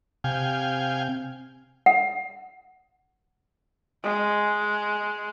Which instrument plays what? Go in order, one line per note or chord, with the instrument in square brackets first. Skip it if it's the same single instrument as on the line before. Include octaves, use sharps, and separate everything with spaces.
[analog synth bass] C3 [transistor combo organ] F5 G5 G#5
[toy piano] F#5
[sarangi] G#3